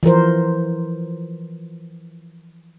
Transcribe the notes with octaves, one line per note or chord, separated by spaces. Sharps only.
E3 F3 A#4 C5